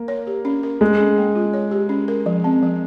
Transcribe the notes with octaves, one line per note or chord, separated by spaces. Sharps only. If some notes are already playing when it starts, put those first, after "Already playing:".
Already playing: A#3
C#5
G4
C#4
A#4
G#3 G#4
C#4
A#3
F4
C#5
G4
C#4
A#4
F3
C4
F3